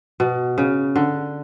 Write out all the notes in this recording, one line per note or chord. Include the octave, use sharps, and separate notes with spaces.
B2
C#3
D3